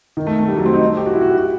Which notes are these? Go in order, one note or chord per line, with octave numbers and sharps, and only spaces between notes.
D#3
A3
A3
G3
F#3
C4
D#4
G4
F#4
E4
F#4
G4
F#4